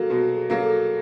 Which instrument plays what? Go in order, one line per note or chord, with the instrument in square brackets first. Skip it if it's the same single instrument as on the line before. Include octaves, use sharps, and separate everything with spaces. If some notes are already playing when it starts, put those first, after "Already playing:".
Already playing: [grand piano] F#3 A#3 [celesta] F#4 G#4 A4
[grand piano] B2 [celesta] F#4
[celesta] G#4
[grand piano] F#3 A#3 [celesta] G#4
[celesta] A4